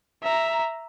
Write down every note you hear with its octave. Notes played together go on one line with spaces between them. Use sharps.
E5 A#5